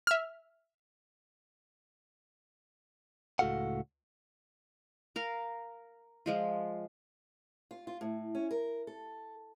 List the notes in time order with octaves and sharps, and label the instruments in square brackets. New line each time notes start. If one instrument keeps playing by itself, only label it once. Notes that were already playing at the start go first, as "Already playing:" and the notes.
[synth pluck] E5 F6
[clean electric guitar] C#2 A2 F#4 A4 F5 F#5
[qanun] A#4 F5
F3 G#3 F4
[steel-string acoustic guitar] F4
F4
A2
C#4
A#4
A4